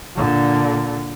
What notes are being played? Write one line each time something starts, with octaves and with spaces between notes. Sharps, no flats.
A#2 D3